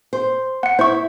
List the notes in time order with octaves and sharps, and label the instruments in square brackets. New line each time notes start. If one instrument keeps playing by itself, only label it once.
[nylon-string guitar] C5
[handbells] F#5 C#7
[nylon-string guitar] E4 [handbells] C5 C#6